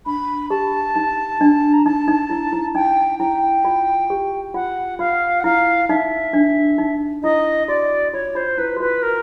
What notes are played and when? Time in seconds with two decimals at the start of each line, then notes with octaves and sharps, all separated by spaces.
0.06 D4 B5
0.50 G4 A5
0.96 D#4
1.41 D4
1.73 A#5
1.85 D#4 A5
2.08 D#4
2.30 E4
2.53 E4
2.75 D#4 G5
3.19 E4 G5
3.65 F4
4.10 G4
4.54 F4 F#5
4.99 F4 F5
5.40 F#5
5.44 E4 F5
5.89 D#4 E5
6.33 D4
6.78 D#4
7.23 E4 D#5
7.68 F#4 D5
8.13 F4 C#5
8.35 F4 C5
8.58 E4 B4
8.77 F#4
8.80 F4 B4
9.03 A#4